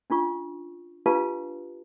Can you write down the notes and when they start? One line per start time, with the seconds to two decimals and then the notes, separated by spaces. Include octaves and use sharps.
0.10 C#4 D4 F4 C#6
1.06 D4 F4 G4 B4 F5 A5